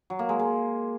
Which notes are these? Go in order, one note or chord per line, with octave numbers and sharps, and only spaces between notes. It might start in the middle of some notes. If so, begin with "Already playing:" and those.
F#3
A#3
G#3
G#3